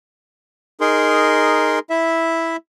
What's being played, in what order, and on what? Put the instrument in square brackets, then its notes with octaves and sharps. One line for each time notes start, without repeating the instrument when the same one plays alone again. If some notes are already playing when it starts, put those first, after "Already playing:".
[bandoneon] D#4 G#4 A#4 C6
E4 E5